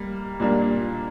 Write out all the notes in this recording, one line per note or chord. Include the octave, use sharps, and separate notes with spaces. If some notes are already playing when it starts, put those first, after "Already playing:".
Already playing: G3 A#3
A#2 G3 A#3 D4